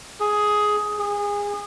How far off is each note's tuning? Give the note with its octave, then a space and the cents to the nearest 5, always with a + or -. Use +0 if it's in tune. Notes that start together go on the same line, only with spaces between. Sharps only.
G#4 +10
G#4 -25